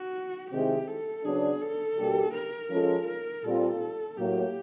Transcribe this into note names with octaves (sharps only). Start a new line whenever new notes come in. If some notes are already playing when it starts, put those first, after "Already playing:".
Already playing: F#4
C3 D#3 G#3 C4 E4 G4
A4
C#3 F#3 B3 D4 G#4
A4
B2 G3 A#3 D4 G4
A#4
F3 G#3 C#4 F4 A4
A#4
A#2 G3 C4 F4 A4
A2 F#3 A#3 G4